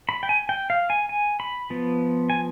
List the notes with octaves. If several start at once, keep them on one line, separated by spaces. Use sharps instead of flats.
B5
G5
G#5
G5
F5
G#5
G#5
B5
F3 B3
G#5